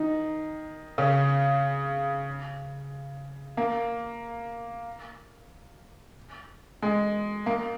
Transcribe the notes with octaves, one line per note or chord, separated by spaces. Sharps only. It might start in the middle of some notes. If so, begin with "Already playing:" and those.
Already playing: D#3 D#4
C#3 C#4
A#3
G#3
A#3